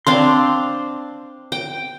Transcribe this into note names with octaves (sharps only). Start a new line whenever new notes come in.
C4 D4 F5 C6
G5